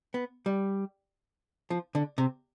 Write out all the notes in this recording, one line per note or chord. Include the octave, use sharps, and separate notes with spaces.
B3
G3
F3
D3
C3